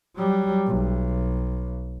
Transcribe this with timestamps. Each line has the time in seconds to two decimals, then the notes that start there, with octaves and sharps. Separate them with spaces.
0.16 F#3 G3
0.67 B1